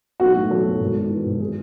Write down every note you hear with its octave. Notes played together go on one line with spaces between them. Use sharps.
B1 F#4
A2
F#3 A4
B1
G#1
G#2
E3
G#1
G#4